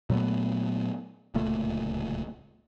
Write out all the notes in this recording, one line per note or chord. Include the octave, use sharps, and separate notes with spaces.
A#2 F#3 A3 B3
D1 C#2 A#2 A3